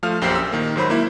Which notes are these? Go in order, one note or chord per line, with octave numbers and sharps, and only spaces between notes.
F3 A3 C5 F5 F6
A#1 F#2 G4 C5 C7
E6
D#3 A#3
G#2 F#3 C5 B5
A#3 E4